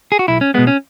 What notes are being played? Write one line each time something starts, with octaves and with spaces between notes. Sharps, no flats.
G#4
F#4
B1 E4
C#4
B2 G#3 B3
C#4